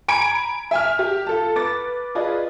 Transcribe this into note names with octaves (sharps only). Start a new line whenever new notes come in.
G#5 A#5 B5 G#6 D7
E5 G#5 F6
G4
F4 A4 A5
B4 D6 A6
F4 G#4 B4 D5 D#5